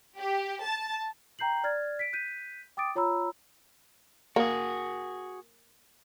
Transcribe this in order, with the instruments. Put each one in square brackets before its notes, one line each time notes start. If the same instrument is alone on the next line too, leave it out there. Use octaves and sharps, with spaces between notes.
[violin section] G4
A5
[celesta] G5 A#5 G6 C7 F#7
D5 F6 G#6 A6
B6 D7
F#6 G6 B6 D#7
G5 D6 D#6 A6 D7
F4 C#5 A#5 B5 E6
[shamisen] A#3 [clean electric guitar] F#4 G#4